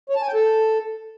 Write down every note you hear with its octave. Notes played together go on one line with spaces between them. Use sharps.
C#5
A5
G#5
G5
A4